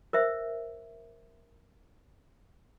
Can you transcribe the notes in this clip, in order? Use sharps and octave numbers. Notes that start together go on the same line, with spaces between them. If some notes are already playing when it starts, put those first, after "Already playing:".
A#4 C5 E5